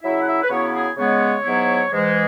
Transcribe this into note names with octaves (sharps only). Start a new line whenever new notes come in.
C#3 F#3 E4 E5
F#5
E5
B4
C#3 F#3 B3 E4 C#5
G#4
C#3 G#3 B3 C#5
G#2 F#3 B3 E4
G#2 E3 G#3